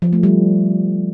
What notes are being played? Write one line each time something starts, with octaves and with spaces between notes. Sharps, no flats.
F3
A3
G3